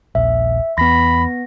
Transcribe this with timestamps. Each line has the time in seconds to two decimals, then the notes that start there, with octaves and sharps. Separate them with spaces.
0.15 D#1 A#1 E5
0.78 E2 B3 B5 A#6